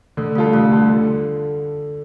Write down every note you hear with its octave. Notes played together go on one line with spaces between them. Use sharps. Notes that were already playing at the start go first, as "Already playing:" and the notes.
D3 A3
G3 A3 F4 A4
D3 A3
G3 F4 A4
D3